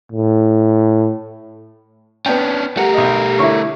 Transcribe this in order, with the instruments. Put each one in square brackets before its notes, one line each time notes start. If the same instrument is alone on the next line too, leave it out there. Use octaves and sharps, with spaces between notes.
[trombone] A2
[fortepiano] B3 G5 [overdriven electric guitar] C#4 D4
[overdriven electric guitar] A3 A#4 [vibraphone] G4 [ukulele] F#5
[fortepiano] B1 D#5
[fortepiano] D3 [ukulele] E4 C#5